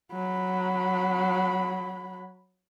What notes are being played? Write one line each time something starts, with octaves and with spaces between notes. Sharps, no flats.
F#3 B5